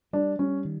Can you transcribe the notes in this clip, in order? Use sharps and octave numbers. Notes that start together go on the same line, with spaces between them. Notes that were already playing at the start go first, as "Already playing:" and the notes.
G3 D4
G3 C#4
D#3